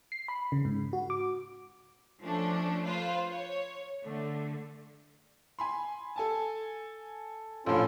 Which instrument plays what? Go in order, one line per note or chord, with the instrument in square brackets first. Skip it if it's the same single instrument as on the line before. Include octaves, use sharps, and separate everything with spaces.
[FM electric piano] C7
B5
C#3
G#2
F#4
D6
[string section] F3 A3 C#4 D4
F4 B4 C5
C#5
D3 A3
[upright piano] G#5 B5 C6
A4 G#5 A5
[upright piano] A#1 A2 [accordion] C#4 F4 A4